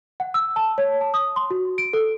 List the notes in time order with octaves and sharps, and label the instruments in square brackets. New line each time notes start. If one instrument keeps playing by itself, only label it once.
[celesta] F#5
E6
A5
C#5
A5
D#6
C6
F#4
D7
A4